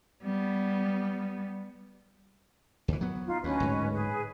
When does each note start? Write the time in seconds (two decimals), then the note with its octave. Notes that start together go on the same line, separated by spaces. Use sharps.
0.23 G3 B3
2.88 D2 E3
3.01 F#3 B3
3.26 D#4 F4
3.44 D2 C#4 B4 D#5
3.60 D1 G#2
3.93 G#4 B4